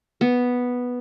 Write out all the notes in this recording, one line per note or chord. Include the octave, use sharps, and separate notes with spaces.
B3